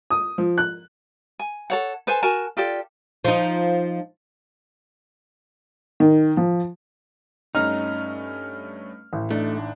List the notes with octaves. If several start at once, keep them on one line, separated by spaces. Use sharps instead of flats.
D#6
F3
F#6
G#5
A4 C#5 F#5
A4 B4 C5 G#5
F#4 A#4 G#5 A5
F4 G4 A4 D5
F3 D#4
D#3
F3
G2 A3 C#4 D#4 F6
A1
A3 D4 D#4